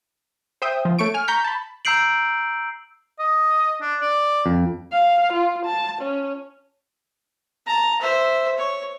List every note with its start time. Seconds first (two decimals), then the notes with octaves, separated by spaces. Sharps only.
0.62 C5 E5 G5 D#6
0.85 F3
0.99 A3 C#5 C#6 D7
1.14 G#5 F6
1.28 A#5 C#6 G6 B6
1.44 A5 B5
1.85 A#5 E6 G6 C7 D7 F#7
3.19 D#5
3.81 D4
4.01 D5
4.46 F2
4.92 F5
5.33 F4
5.66 A5
6.02 C#4
7.67 A5 A#5
8.01 C5 E5
8.58 C#5